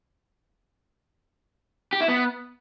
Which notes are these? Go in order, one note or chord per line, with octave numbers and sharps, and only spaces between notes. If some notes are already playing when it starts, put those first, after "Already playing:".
G4
E4
B3